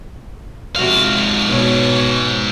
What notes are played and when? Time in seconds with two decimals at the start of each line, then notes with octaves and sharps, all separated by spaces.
0.76 F2 G#2 C3 F#4 F5
1.46 B2 C#5